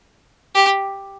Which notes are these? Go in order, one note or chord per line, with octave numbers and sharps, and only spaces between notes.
G4